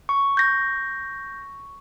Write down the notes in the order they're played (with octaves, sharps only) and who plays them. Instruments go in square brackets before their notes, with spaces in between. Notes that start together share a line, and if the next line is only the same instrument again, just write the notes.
[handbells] C#6
[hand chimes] G6 A#6